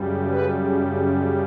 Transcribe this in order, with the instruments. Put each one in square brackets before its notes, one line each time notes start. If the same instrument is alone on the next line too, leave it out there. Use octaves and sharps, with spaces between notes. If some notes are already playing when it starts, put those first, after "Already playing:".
Already playing: [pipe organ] F#2 C#3 G3
B4